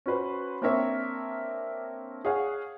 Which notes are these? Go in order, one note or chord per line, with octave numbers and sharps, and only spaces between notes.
C#4 F#4 B4 C5
A#3 C4 D4 A#4 C#5 E5
G#4 C#5 F5 F#5